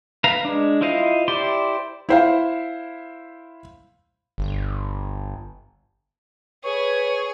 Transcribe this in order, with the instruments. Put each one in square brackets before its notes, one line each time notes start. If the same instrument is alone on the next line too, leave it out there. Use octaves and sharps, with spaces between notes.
[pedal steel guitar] B4 F5 A#5
G#3 D4
E4 F4 C5 D#5 F5
E4 G4 C5 D5 C6
[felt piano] E4 C5 F5
[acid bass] G1
[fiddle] G#4 [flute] B4 [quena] C#5 [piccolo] C#6